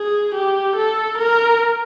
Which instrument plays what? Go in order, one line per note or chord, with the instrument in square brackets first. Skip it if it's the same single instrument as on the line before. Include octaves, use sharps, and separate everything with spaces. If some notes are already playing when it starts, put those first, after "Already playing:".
Already playing: [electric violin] G#4
G4
A4
A#4